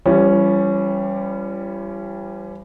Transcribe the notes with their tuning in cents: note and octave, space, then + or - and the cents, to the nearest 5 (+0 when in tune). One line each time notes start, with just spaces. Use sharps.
E3 +45 G3 +0 C#4 +0